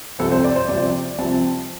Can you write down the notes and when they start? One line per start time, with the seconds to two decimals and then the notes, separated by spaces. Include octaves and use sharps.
0.19 C2 C3 F3 C4 A4
0.32 C5
0.44 D5
0.56 C5
0.68 C2 C3 F3 C4 D5
1.18 C2 C3 F3 C4 A5